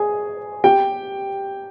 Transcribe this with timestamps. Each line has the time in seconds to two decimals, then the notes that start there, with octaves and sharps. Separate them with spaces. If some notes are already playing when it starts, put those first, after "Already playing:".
Already playing: G#4 G#5
0.64 G4 G5